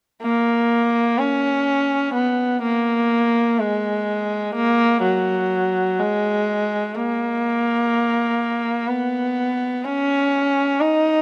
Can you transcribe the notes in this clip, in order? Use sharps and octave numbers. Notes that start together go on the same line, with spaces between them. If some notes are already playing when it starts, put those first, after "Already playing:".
A#3
C#4
B3
A#3
G#3
A#3
F#3
G#3
A#3
B3
C#4
D#4